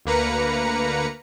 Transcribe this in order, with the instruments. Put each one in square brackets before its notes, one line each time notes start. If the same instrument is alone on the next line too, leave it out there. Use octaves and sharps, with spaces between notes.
[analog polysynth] D2 A#3 B4 A#5 C#7